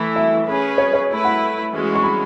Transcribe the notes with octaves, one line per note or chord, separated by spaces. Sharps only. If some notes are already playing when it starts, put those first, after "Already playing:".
Already playing: E3 A3 E4
E5
C#4 G#4 B4
C#5
C#5
A3 E4 B4
F#5
E3 G#3 C#4 F#4
C#6
B5